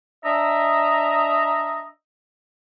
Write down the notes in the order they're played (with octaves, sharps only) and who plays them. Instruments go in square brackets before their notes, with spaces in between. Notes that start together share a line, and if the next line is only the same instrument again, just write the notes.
[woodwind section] D4 D#5 E5 A#5